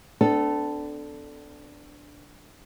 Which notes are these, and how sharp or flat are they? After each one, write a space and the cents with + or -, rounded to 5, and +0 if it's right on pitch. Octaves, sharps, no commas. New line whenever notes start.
B3 +45 D4 +0 A4 +0